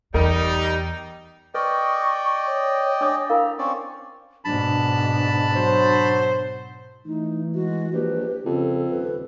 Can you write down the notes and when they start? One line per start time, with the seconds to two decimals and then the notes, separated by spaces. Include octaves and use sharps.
0.14 E2 G3 D#4 A#4
1.55 B4 D5 D#5 G5 C#6
2.46 C#5
3.01 D4 D6 D#6
3.30 E4 A#4 F5 A#5
3.59 C4 C#4 D5 C#6
4.45 G#2 B2 D4 A5 B5
5.55 F#3 C5
7.06 E3 A3 D#4
7.55 G#3 F#4
7.93 A#1 G4 B4
8.46 F2 C#3 A4
8.90 D#1 B4